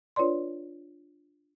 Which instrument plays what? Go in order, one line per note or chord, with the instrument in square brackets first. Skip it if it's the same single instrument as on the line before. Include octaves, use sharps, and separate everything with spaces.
[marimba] D4 F4 B4 C#5 D5 C6